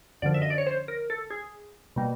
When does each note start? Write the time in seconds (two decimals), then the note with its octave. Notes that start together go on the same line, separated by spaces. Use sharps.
0.22 F#2 D3 F3 D5
0.34 E5
0.42 D#5
0.50 D5
0.58 C#5
0.67 C5
0.88 A#4
1.10 A4
1.30 G#4
1.96 B2 G3 A#3